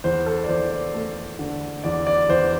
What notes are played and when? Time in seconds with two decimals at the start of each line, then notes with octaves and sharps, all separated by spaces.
0.04 E2 C5
0.26 A4
0.44 D5
0.49 E2 C5
0.71 D5
0.94 A3
1.39 D3
1.84 E2 D5
2.07 D5
2.29 E2 C5